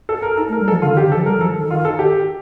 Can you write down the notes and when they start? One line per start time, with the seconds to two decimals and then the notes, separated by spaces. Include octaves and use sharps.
0.09 A4
0.22 A#4
0.37 D#4 A4
0.49 A3
0.52 A#4
0.60 G3
0.68 A4
0.70 F3
0.82 D3 F4
0.93 D#3
0.97 G4
1.04 D3
1.12 A4
1.15 F3
1.26 G3 A#4
1.36 D#3
1.41 F3 A4
1.56 D#3
1.71 F4
1.85 A4
1.99 G4